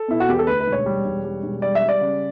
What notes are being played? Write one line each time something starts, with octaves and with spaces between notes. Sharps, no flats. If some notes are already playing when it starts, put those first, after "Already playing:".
Already playing: A4
B2 E4
F#4
E2 G4
A4
D2 B4
B4
E1
C#5
G3
E1
G3
E1
G3 D5
E5
G3
D5
C#3